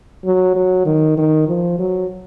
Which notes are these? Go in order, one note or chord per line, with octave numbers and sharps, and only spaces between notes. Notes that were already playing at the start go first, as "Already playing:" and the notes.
F#3
F#3
D#3
D#3
F3
F#3